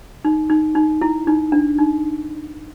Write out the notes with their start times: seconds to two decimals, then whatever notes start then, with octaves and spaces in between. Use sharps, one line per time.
0.25 D#4
0.50 D#4
0.75 D#4
1.01 E4
1.27 D#4
1.52 D4
1.78 D#4